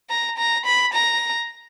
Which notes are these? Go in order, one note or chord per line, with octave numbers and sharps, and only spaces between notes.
A#5
A#5
B5
A#5